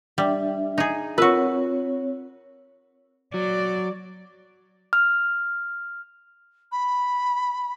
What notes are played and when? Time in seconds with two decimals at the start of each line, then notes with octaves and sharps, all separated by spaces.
0.18 G3 D4 E5
0.78 D#4 G#4
1.18 C4 F4 F#4 A#4 B4 C#5
3.34 F#3 D5
4.93 F6
6.72 B5